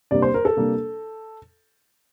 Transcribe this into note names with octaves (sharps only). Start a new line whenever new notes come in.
C3 G3 A#3 D4 D5
C5
A#4
A4
C3 G3 A#3 D4